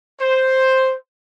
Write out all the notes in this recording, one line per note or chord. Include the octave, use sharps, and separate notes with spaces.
C5